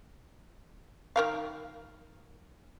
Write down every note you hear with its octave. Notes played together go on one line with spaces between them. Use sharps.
D#3 A#4 F5